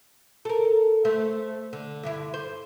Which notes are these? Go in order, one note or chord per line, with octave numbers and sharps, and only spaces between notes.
A4 A#4
A3 C5
D3
G2 D3 E4
C5